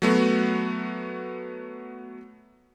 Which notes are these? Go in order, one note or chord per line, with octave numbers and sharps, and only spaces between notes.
F#3 A3 B3 F#4